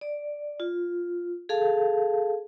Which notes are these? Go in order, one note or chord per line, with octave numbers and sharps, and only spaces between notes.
D5
F4
G#4 A4 F5 A5